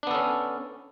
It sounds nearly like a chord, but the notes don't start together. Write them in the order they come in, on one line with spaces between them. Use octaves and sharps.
D4 B3 A4 C#4